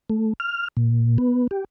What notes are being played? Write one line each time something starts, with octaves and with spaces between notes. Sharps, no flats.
A3
F6
A#2
B3
G4